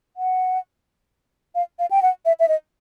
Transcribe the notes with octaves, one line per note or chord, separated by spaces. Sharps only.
F#5
F5
F5
G5
F#5
E5
E5
D#5